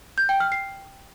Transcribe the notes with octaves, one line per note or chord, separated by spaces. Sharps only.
G6
G5
F6
C7